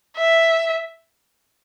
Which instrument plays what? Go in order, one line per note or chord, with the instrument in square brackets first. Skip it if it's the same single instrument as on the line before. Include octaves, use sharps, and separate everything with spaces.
[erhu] E5